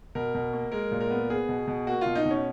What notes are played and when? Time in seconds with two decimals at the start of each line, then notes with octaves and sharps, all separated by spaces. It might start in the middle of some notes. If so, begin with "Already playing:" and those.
0.15 B2 A#4
0.34 B2
0.53 A#3
0.72 G#3 A#4
0.92 A#2
1.01 A#4
1.10 B3
1.29 B3 G#4
1.49 B2
1.68 B2
1.87 A#3 F#4
2.01 B2 F4
2.15 D#4
2.25 B2 C#4